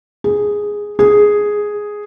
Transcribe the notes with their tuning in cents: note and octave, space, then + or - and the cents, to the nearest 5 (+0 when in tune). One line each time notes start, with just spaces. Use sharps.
G#4 -5
G#4 +0